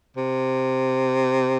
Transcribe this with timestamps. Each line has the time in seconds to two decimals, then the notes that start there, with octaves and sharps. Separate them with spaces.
0.16 C3